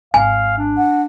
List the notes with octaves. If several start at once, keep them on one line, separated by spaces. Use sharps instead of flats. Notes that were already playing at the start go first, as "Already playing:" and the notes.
G#1 F5 G#5
D4
F#5